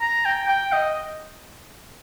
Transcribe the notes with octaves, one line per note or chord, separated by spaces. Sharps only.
A#5
G5
G5
D#5